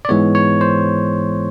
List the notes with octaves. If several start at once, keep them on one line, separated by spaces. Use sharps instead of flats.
D5
G#2 E3 G#3 B3 C#5
C#5
C5